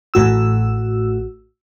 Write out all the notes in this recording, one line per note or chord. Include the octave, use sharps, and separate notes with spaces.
A1 A2 F#4 E6